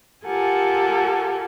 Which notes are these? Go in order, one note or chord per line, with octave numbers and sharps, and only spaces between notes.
F4 G4 A4 A#4 F#5 G#5